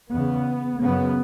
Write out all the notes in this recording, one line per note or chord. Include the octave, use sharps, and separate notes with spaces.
E2 C#3 B3
F#2 C#3 B3